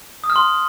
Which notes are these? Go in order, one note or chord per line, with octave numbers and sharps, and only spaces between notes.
D#6
F6
C6